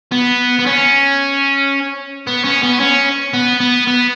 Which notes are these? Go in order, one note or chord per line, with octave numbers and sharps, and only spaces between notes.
B3
B3
C#4
B3
C#4
B3
C#4
B3
B3
B3